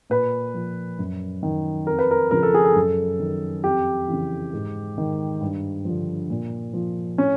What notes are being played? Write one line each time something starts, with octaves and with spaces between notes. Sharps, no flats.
A#2 B4
F3
F#2
D#3
F2 A#4
B4
A#4
C#3 F3 A#4
A4
G#4
A4
F#2
D#3
F2 G4
C#3 E3
G#2
D#3
G2
D3 F3
A#2
F3
A2 C#4